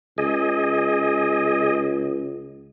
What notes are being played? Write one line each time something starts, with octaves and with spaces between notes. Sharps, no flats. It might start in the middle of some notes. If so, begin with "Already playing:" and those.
C#2 G#4 D#5